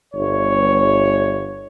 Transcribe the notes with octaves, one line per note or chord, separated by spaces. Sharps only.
G1 C#5